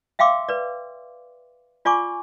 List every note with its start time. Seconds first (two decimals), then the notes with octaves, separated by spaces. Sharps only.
0.19 E5 F5 G5 C6 D6 E6
0.49 B4 D5
1.85 F4 D5 G#5 C#6 D6